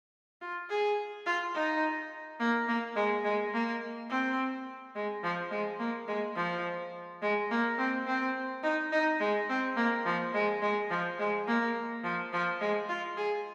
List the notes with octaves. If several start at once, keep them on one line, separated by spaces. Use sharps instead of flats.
F4
G#4
F4
D#4
A#3
A#3
G#3
G#3
A#3
C4
G#3
F3
G#3
A#3
G#3
F3
G#3
A#3
C4
C4
D#4
D#4
G#3
C4
A#3
F3
G#3
G#3
F3
G#3
A#3
F3
F3
G#3
F4
G#4